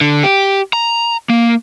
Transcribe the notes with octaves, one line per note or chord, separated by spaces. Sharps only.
D3
G4
A#5
A#3